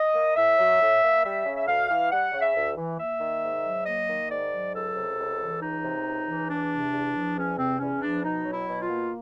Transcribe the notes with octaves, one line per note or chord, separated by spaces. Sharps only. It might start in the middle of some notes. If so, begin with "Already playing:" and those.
Already playing: D#5
A#3
A2 E5
F#3
A2
A#3
G3 E5
C#3
E5
D2 F5
E3
G3 F#5
C#3
E5
D2
E3
A#3 E5
D#3
G#2
F#3
A#3 D#5
D#3
G#2 D5
F#3
C#2 A4
C3
C#2
E3
C#2 D#4
C3
C#2
E3
E2 D4
C3
E2
F3
E2 C#4
C3 C4
E2 C#4
F3 D4
B2 D#4
F#3
E4
B2
F4
A#3